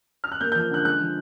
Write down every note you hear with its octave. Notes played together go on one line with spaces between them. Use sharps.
F6
F#6
A#3 G6
F3 G6
D3 F#6
G#3 F#6
F3